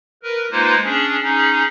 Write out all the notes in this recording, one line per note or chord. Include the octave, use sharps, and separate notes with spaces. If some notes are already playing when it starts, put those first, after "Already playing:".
A#4 B4
G#3 A#3 D#4 F4 B4 C5
C#4 D4 G#4
C#4 D#4 G#4